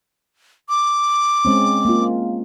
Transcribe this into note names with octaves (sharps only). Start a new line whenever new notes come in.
D6
G#3 C4 C#4
A#3 F4